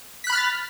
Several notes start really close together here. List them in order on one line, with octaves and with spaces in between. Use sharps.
B6 F#6 B5 F6 A6